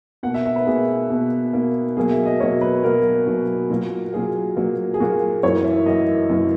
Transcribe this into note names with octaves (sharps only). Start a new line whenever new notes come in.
B2 A#3 F#5
E5
E5
B4
B2 A#3 G#4
B2 A#3
B2 A#3
B2 F#3 A#3 G#4
E5
D#5
B2 F#3 A#3 C#5
B4
B2 F#3 A#3 A#4
B2 F#3 A#3
A#2 F#3 A#3
A#2 F#3 A#3 G#4
A#2 F#3 A#3
G#4
A#2 F#3 A#3 F#4
F#2 E3 A#3 C#5
E5
F#2 E3 A#3 D#5
F#2 E3 A#3